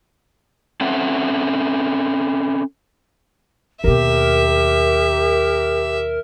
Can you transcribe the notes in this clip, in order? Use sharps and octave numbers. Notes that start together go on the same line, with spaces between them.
C4 C#4 A4 E5 F#5
D#2 B2 G4 A#4 E5